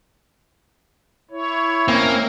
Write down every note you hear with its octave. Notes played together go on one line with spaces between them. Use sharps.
E4 C#5
A#3 C4 C#4 D#5